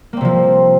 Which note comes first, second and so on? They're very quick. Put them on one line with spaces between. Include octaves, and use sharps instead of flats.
A#3 C4 C3 F3